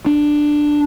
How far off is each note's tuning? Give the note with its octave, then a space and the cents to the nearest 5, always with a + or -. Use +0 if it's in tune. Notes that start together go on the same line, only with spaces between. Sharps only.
D4 +10